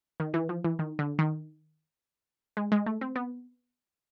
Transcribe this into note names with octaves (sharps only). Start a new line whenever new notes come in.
D#3
E3
F3
E3
D#3
D3
D#3
G#3
G#3
A3
C4
B3